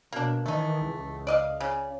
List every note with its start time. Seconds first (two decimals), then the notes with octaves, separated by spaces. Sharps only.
0.13 B2 A#3 D4
0.46 D#3 E3 A3 D#4
0.82 C#2
1.27 D5 D#5 F5
1.61 C#3 D5